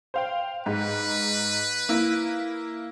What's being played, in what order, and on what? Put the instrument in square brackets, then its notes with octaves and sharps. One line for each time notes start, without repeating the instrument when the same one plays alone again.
[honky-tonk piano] C5 F5 G5
[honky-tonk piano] G#2 [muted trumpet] B4
[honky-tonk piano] A#3 E4